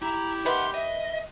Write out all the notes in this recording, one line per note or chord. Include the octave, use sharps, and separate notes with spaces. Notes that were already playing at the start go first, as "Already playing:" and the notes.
E4 G4 A#5
D#3 B4 E5 F#5 C6
D#5 E5